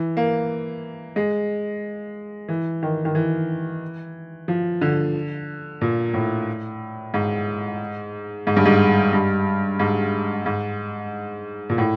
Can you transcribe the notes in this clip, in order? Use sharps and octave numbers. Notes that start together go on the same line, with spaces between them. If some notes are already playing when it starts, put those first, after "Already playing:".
Already playing: E3
A#3
G#3
E3
D#3
D#3
E3
F3
D3
A#2
A2
G#2
G#2
G2
G#2
G2
G#2
G#2
A#2
A2